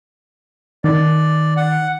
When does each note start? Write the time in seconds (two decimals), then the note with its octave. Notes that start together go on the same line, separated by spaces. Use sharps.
0.84 D#3 D5
1.57 F#5